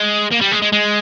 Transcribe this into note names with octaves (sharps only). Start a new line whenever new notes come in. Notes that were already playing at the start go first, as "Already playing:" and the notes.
Already playing: G#3
A#3
G3
G#3
G#3
G#3